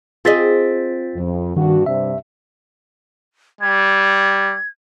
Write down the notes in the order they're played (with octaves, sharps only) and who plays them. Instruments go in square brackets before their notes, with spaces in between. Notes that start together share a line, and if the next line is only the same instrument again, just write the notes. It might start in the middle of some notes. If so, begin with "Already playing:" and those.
[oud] C4 G#4 D#5 [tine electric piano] F4 A6 B6
[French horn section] F2
[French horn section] G2 F#4 [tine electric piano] D#3
[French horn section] G2 C3 [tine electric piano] E5
[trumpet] G3 [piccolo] G#6